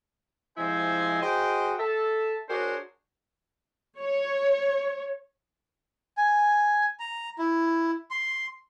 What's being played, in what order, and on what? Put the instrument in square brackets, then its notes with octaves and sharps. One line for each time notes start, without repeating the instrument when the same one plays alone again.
[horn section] C3 F3 G#3 E4 C5 G#5
F#4 G#4 C5 D#5 G5
A4 E5 A5
D4 F#4 G#4 A#4 C5 C#5
[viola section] C#5
[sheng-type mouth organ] G#5
A#5
E4
C6